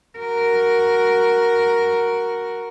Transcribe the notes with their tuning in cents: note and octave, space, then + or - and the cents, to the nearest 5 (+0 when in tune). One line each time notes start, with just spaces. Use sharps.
F#4 +0 A#4 +0